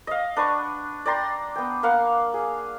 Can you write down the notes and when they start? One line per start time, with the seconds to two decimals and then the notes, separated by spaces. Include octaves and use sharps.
0.07 D#5 F5
0.36 D4 B4 F#5 C#6
1.06 D5 G5 A#5 C6
1.55 B3 G5
1.83 A#3 F5 F#5
2.34 G#4